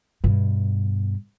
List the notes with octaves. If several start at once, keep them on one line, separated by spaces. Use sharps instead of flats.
G2 B2